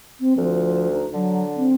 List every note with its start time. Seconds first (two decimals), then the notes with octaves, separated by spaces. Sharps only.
0.20 C4
0.37 D2 F3
0.92 D#4
1.14 D3 F#3
1.56 C4